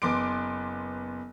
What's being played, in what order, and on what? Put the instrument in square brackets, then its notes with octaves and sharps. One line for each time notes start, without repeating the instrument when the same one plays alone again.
[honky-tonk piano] F#1 B3 C6 D6 D7